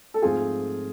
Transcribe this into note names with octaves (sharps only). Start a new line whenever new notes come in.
A4
G#2 F3 A3 C4 F4 G#4